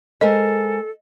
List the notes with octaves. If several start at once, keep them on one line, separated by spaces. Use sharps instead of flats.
G#3 A4 A#4 C5 D#5